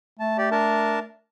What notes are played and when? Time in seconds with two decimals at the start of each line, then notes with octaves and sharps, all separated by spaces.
0.20 A3 A5
0.38 G4 D5
0.52 D4 A#4 A5